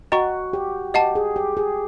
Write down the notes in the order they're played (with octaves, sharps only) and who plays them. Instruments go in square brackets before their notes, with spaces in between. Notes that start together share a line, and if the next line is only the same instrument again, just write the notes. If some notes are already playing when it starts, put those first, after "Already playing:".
[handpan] F#4 [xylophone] D#5 G5 A#5 C#6
[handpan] G4
[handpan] G4 [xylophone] D#5 F#5 A5
[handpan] G#4
G4
G#4